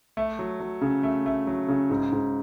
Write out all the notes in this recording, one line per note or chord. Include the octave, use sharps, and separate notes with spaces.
A3
F#3
F#3
C#3
A3
A3
F#3
C#3
G#2
G#2